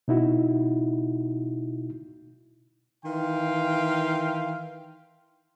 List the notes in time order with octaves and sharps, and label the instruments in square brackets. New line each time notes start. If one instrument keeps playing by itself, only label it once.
[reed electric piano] B2 D#4 E4 F#4
[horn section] D#3 E3 F5 G5 C6